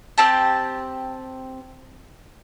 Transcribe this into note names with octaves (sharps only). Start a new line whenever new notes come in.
C4 G4 A5